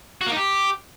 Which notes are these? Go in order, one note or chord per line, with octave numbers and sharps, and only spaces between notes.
F#4
A#3
D#4
G4